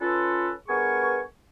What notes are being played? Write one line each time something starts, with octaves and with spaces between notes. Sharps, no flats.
C#4 F4 A4 B4
G2 B3 G#4 A#4 G#5 C#6